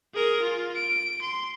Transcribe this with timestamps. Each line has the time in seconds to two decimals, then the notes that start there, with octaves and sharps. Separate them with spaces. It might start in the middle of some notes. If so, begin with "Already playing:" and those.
0.14 G#4 A#4
0.42 F4
0.76 D7
1.21 C6